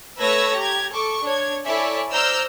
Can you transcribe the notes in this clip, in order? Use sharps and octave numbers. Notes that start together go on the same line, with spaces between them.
A3 B4 C#5 E6 G#6 A#6
G4 A#5 G#6
A4 C#6 D6
D4 C#5 G#6
E4 A4 C#5 D5 E5 G#5
C5 D5 A#5 E6 F6 G6